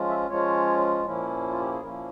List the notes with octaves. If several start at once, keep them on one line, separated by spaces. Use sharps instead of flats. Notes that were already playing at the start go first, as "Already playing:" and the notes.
Already playing: F3 G#3 C#4 F4
E5
F3 G#3 C#4 F4 C#5
A#2 F3 A#3 C#4 E4
F4
G4
G#4
A#2 F3 A#3 C#4 E4 A#4